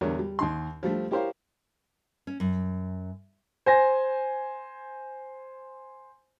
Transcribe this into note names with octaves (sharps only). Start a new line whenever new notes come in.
E2 D3 G3 D4 A#4 C#5
G3
D#2 D#3 C6
F3 G3 A3
E4 G4 A#4 C5 C#5 F5
C#4
F#2
C5 G#5 A#6